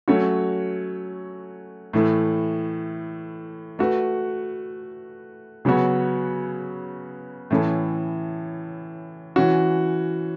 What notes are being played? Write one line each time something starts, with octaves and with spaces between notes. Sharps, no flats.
F#3 A3 C#4 F#4 C#5
A2 E3 A3
A3 F#4 B4
C#3 F#3 B3 F#4 C#5
A2 E3 C#4 A4
E3 C#4 F#4